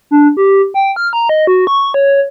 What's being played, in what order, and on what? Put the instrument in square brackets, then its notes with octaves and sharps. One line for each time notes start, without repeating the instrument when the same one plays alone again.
[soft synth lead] D4
G4
G5
F6
A#5
D#5
F#4
C#6
C#5